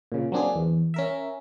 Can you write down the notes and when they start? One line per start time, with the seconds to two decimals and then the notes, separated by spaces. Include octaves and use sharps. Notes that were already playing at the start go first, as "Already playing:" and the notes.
0.12 A#2 C#3
0.32 F#3 A#3 C4 D4 G4 G#4
0.55 E2
0.94 C#4 A#4 E5